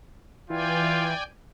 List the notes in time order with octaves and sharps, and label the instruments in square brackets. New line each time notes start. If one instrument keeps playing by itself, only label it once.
[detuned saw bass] E3 [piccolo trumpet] F4 [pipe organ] D5 G5 G#5